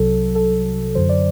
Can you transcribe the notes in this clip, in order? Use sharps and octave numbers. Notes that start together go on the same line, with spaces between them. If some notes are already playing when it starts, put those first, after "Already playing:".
Already playing: C2 C3 F#3 A4
A4
F#2 D3 F#3 C5
D5